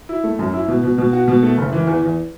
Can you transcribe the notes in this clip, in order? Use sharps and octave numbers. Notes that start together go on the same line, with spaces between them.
E4
A3
F#2
E4
B2
B2
B2
F#4
B2
A3
F#1
E3
E2
E2